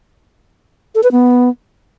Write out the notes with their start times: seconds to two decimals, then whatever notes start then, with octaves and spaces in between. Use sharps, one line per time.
0.95 A4
1.03 B4
1.12 B3